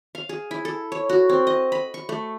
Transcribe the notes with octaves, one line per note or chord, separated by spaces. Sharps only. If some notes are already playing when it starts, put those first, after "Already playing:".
F5
G#4
E4
A4
C#5
F#4
C4
D#5
B5
C#6
A3